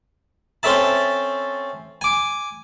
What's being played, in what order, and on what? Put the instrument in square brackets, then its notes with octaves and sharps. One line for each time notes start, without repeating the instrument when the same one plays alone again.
[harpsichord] C4 C#4 A4 E5 A5
G#5 D6